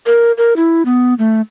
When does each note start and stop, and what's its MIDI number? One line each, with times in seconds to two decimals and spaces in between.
0.06 0.32 70
0.38 0.53 70
0.56 0.83 64
0.85 1.14 59
1.19 1.41 57